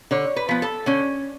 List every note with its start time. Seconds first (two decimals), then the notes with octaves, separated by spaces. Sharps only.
0.11 D3 C#5
0.36 B4
0.49 F3 B3
0.62 A4
0.86 D3 C#4